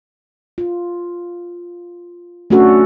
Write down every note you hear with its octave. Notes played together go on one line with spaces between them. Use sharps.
F4
A3 C#4 D4 F#4 A4